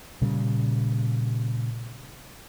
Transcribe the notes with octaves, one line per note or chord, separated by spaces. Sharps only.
A#2 C#3 G3